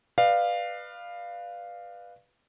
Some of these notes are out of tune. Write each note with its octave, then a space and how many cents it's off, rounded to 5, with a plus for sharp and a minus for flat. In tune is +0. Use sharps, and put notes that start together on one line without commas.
B4 +0 D5 +35 F5 +0